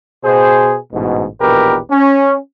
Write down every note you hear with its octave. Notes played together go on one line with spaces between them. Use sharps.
B2 G#4 C5
A1 G#2 B2
A#1 E2 B2 G4 A#4 B4
C#4